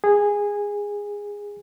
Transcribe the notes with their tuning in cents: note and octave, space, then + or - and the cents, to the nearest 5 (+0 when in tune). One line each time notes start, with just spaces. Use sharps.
G#4 -15